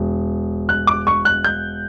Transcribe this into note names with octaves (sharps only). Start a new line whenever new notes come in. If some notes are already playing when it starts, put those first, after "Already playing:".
Already playing: E1
F#6
D6
C#6
F#6
G6